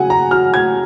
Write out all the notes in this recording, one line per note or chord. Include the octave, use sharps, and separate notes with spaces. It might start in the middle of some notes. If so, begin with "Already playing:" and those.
Already playing: C#3 F#3 F#5 G#5
A#5
F#3 F6
G#6